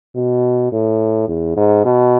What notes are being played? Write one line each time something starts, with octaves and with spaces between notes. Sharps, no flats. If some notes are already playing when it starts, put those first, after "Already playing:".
B2
A2
E2
G#2
B2